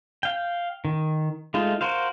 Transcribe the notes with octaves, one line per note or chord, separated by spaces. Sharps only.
F5 G5
D#3
G#3 A3 D#4 F4
F#4 A#4 C5 F5